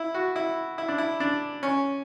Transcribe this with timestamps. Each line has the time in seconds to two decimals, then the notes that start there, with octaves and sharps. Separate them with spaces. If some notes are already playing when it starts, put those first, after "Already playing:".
Already playing: E4
0.14 F#4
0.36 E4
0.78 E4
0.88 D4
0.98 E4
1.20 D4
1.63 C#4